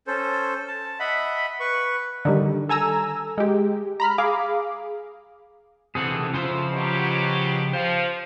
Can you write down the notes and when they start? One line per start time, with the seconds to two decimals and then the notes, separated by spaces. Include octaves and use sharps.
0.07 C#4 A4 C5
0.68 A5
1.00 D#5 E5 F#5 B5
1.60 B4 C#6
2.25 D3 D#3 G3
2.69 A4 G#5 A#5 E6
3.38 G#3 G4
4.00 A#5 B5 F6
4.18 G#4 F5 D6
5.95 C3 E3 C4 G#4 A4 F#5
6.34 C#3 F3 F4 C5 E5 C6
6.73 B2 F#3 G4
7.73 F3 C5